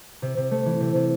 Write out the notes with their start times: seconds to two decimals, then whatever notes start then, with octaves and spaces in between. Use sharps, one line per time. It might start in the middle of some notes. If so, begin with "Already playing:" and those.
0.22 C3
0.37 C3
0.51 A3
0.66 E3
0.80 C3
0.95 C3